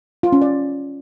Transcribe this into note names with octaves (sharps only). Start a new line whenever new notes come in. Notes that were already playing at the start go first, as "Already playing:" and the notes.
F4
C#4
D5